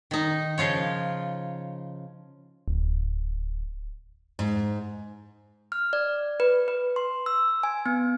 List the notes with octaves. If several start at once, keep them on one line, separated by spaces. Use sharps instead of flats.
D#3 D#4
C#3 F3 F4 C#5
D1
G#2
F6
D5
B4
B4
C6
E6
G#5
B3